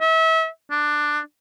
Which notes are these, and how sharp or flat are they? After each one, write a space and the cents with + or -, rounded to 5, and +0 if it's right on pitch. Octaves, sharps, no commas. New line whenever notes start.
E5 -30
D4 +10